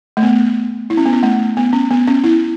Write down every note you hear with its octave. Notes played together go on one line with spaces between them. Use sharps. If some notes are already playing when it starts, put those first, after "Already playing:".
A3
B3
E4
C#4
B3
C#4
A3
B3
C#4
B3
C#4
E4